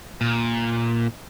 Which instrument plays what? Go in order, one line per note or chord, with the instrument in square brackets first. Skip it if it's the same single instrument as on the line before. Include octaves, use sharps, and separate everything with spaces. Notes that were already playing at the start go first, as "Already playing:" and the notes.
[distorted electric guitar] A#2